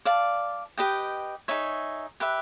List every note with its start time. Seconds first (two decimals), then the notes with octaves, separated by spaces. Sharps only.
0.05 D5 F5 A5
0.77 G4 B4 D#5 G5
1.48 D#4 G#4 C#5 E5
2.20 G4 B4 E5